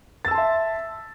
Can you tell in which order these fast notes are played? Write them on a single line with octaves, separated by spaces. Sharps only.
A6 E6 A5 C6 E5